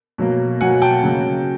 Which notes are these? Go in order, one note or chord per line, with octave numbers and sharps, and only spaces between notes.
B2 F#3 A#3
B2 F#3 A#3 F#5 G#5
G5 A5
C#3 F#3 A#3